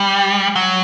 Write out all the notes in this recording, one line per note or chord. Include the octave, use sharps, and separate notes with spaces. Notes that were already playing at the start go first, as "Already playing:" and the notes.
Already playing: G3
F#3